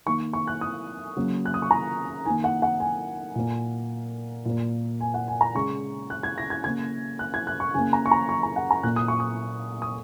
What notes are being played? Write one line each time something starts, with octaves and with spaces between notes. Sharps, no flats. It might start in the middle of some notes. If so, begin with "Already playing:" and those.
D#3 A#3 C#6
C#6
F#6
D#6
C#3 F#3 A#3
F#6
D#6
C#6
A#5
D#3 A#3 G#5
F#5
F#5
G#5
A#2 A#3
A#2 A#3
G#5
F#5
G#5
A#5
C#3 G#3 C#6
F#6
G#6
A#6
G#6
C#3 A#3 G#6
F#6
G#6
F#6
C#6
C#3 A#3 G#5
A#5
C#6
A#5
C#6
A#5
F#5
A#5
A#2 A#3 F#6
D#6
C#6
D#6
D#6